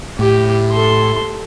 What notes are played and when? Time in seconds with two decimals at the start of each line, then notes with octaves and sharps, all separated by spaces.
0.19 A2 G4
0.73 A4 C6